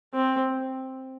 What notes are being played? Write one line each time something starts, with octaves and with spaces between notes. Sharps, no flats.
C4